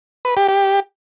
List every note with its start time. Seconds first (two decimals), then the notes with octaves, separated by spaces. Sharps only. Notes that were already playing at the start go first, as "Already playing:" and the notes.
0.25 B4
0.37 G4
0.48 G4